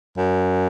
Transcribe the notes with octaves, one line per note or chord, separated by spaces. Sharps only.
F#2